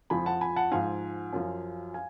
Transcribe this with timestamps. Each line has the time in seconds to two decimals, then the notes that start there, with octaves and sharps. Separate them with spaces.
0.10 F2 F3 G#5 B5
0.26 F#5 A5
0.41 G#5 B5
0.56 F#5 A5
0.71 G#2 F3 F5 G#5
1.33 F#2 F3
1.94 F5 G#5